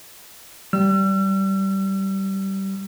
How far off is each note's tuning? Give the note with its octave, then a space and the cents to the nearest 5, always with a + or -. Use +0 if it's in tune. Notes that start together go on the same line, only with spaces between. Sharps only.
G3 -20 E6 +45